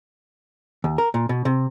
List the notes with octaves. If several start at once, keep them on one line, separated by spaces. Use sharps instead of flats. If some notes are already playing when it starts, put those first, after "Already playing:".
D#2
A#4
A#2
B2
C3